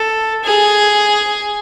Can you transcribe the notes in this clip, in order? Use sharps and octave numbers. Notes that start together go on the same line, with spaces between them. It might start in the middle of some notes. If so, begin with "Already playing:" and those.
Already playing: A4
G#4